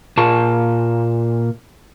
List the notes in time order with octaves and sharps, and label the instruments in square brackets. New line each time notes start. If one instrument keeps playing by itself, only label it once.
[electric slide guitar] A#2 F4 A5